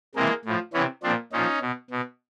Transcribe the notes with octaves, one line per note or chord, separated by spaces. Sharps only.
C3 E3 G#3 A#3
A2 F3
C3 E3 B3 C#4
A#2 F3 C4 D4
A#2 F3 C#4 D#4
B2
B2